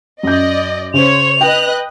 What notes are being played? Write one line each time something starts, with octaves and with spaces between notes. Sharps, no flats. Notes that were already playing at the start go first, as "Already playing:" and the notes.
F#2 D5 D#5 G6
C#3 C5 C#5 F7
B4 D#5 G5 F#6